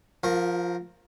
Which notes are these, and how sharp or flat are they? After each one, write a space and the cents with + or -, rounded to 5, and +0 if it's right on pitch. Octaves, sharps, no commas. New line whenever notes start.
F3 +0 F4 +45 A#4 +0